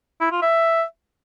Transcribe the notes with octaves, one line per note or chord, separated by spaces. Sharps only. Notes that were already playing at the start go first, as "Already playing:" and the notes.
E4
F4
E5